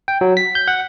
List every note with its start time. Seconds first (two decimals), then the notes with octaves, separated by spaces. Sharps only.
0.08 G5
0.21 F#3
0.37 B6
0.55 G6
0.68 F#5